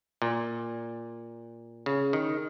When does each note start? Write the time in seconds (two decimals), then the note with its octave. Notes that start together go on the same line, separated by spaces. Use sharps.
0.22 A#2
1.86 C#3
2.13 D#3